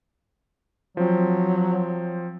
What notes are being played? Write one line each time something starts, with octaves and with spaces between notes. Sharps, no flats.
F3 F#3 C4